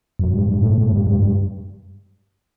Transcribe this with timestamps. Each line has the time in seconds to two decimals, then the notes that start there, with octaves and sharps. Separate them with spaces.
0.19 F#2
0.34 G2
0.49 G2
0.62 A2
0.78 A2
0.92 G2
1.07 G2
1.22 G2